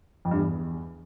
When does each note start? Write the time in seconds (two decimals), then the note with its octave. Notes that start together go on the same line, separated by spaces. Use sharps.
0.25 F2
0.31 G2
0.38 E2